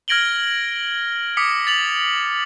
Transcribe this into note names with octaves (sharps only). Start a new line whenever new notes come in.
F6 G#6 A#6 D7 F#7 G7
D6 D#6 B6 C#7
A6 F7 F#7